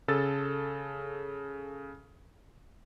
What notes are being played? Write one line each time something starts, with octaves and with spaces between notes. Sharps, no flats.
C#3 A4 E6 A6